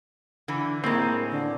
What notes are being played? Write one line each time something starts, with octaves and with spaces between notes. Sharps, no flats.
D3 E3
A2 G#3 A#3 C4
D3